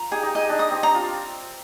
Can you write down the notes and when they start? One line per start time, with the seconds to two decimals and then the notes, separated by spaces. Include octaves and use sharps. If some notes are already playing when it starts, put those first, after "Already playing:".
Already playing: F4 A#5
0.11 D#4 G4 G#4
0.23 D#4 G4
0.35 D#4 G4 D#5
0.49 D4
0.59 D#4 D#6
0.71 C4
0.82 D4 A#5
0.95 F4